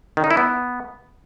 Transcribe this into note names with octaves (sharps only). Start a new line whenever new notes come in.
D#3
D#4
E4
B3